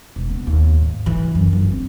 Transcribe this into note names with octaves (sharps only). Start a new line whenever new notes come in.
E1
B3
D#2
G#2
E3
F#2
G1
C4